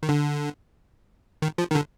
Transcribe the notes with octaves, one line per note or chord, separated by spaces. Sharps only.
D#3
D3
D#3
F3
D#3
D3